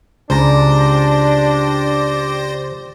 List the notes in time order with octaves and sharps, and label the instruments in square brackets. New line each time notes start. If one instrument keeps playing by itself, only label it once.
[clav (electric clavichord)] C#2 A#5 [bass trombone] D4 [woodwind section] G4 D5 [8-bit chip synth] C5 A#6